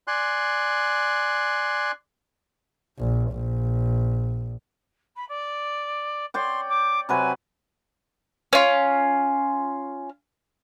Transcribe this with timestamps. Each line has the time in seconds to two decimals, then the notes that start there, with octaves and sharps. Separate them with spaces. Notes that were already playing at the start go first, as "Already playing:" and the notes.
0.07 D5 G#5 C6 F#6
2.99 A#1
3.31 A#1
5.16 B5
5.28 D5
6.34 C#5 D5 G5 C6
6.69 D6
7.09 C3 F#3 B4 G#5
8.53 C#4 F4